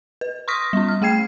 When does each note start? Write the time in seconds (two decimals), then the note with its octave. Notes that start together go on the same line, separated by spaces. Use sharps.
0.21 B4
0.48 C6 C#6 D#6 F6 A#6 B6
0.73 G3 C#4
0.88 F6
1.02 A3 G#4 G5 G#6 C7